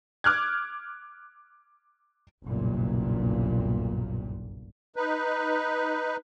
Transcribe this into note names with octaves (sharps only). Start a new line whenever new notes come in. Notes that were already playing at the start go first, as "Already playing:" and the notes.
D6 F6 F#6 G#6
F#1 B1 G2 A#2
D#4 B4